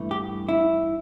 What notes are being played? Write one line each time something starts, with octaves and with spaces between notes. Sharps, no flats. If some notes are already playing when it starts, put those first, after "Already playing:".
Already playing: G2 E3 A3
G4
E4